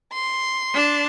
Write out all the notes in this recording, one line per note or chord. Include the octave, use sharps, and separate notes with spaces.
C6
D4 A5